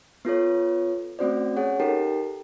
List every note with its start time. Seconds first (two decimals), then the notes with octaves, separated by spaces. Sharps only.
0.25 B3 F4 A4 C#5
1.19 A3 C4 C#4 F#4 C5 D5
1.56 C#4 G#4 C#5 F#5
1.80 D#4 G4 A4 A#4 G5